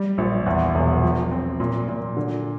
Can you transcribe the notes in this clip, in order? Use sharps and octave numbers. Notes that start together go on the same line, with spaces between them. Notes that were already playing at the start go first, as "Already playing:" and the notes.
Already playing: G3
A#1
E2
E1
F3
C4
A#2
A#2
D3